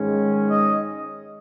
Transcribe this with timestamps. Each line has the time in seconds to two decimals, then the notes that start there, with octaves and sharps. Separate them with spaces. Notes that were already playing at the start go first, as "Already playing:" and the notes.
Already playing: G#2 D#3 G#3 C#4
0.50 D#5